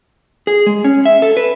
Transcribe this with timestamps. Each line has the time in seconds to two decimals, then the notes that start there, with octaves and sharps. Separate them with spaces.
0.47 G#4
0.66 G#3
0.84 C#4
1.06 E5
1.22 A4
1.37 B4